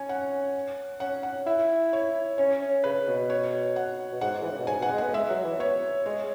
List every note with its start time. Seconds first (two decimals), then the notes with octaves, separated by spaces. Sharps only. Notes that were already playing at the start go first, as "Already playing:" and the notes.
Already playing: C#4 C#5 G#5
0.09 F#5
1.00 C#4 F#5
1.23 F#5
1.46 E4 E5
1.93 C#5
2.38 C#4 C#5
2.61 C#4
2.84 C#3 B4
3.07 B2
3.30 C#5
3.76 F#5
4.12 B2
4.21 G#2 F#5
4.42 E3
4.50 C#3
4.59 B2
4.67 G#2 G#5
4.80 B2 F#5
4.91 G#3
4.98 B3 F#5
5.13 G#3 E5
5.29 F#3
5.44 E3
5.59 B3 C#5
6.06 G#3 C#5